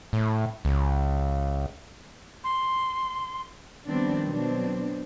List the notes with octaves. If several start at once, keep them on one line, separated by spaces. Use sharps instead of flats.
A2
C#2
C6
D#3 F3 G3 B3 C4 D4
B2 F#3 C4 D4